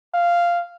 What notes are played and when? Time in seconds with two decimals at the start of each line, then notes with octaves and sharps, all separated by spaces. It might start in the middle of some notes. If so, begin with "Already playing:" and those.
0.14 F5